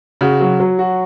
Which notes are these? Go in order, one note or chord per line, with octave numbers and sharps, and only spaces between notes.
C#3 F#4
F#3
F#3
F#4